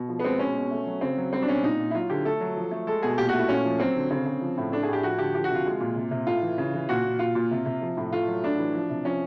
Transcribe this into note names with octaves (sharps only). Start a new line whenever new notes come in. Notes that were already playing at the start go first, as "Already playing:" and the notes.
Already playing: B2
F3
B3
G#3 C4
B2 C#4
B2
A3
F#3
C#3 C4
F#3
G3 C4
D4
B2 C#4
A#2 D#4
A#2
E4
F#3 F4
D3 G4
A3 A4
F#3
F3
A3
G#3 A4
B2 G#4
A#2 G4
F#4
A3
E4
A#2 C#4
F3
F#3 C4
D3
C#3 C4
C#3
F3
A2
A3 D4
G#4
A2 G4
F3 F#4
D3 G4
F3 G4
F#4
C3
F4
G#3
A#2
C3
C3
A2 F4
E3
C#3
E3
A#2 F#4
A#2
A#2 F4
A#2
C3
C3
F3
A2
A3 F4
F#3
A2 D4
E3
F3
C3
F3 C#4